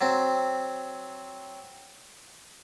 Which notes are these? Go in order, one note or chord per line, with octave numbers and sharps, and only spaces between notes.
F#3 C4